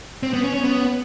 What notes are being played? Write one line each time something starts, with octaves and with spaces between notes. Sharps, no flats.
C4
B3
C#4
C#4
B3